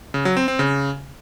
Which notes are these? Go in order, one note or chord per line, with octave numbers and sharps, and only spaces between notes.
C#3
F#3
C4
C4
C#3